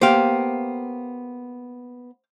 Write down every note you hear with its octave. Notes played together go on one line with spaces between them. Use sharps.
A#3 B3 G4 C5 F5